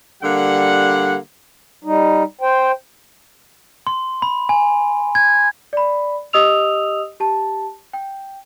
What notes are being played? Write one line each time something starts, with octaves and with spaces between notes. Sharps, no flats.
D3 G3 A#3 F#5
G3 D#4
C5 G5
C6
B5
G#5
G#6
D5 B5
G4 D#5 D#6 E6 F7
G4 A5
G5